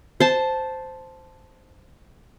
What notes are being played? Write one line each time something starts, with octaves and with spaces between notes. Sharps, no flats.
C5 A5